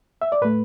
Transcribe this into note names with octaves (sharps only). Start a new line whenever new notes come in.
E5
D5
A2 A3 B4